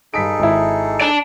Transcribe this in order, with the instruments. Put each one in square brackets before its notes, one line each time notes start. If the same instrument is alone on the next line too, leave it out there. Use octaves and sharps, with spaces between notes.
[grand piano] G2 B6 D7 [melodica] D#4 G#4 A4
[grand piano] G#1 E4
[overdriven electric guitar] D5 A5